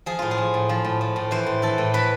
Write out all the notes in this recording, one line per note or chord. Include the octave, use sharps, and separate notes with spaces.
F3 G#4
A2 F4
G#4
F3
A2
F3
A2
F3
A2
E3 C5
A2
E3 A4
A2
E3 B4